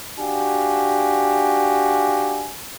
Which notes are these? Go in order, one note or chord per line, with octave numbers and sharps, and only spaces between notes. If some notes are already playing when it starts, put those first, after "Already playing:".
D4 F#4 G4 F5 G#5